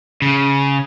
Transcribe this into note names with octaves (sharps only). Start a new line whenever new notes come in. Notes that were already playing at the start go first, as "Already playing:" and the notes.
C#3